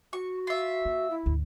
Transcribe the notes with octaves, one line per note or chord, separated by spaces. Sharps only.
F#4 C#6
F4 E5
A#3
E4
D2 G#2